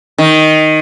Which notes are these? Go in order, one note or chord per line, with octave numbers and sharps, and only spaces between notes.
D#3